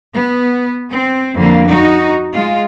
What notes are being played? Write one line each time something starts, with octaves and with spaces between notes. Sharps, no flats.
B3
C4
F2 D3 A#3
D#4 F#4
G#3 F4